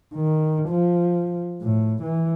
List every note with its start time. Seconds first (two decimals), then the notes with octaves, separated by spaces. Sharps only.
0.15 D#3
0.69 F3
1.62 A2
2.02 E3